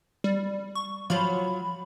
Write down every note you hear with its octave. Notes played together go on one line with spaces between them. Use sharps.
G3
C#6
F3 F#3 F4 B5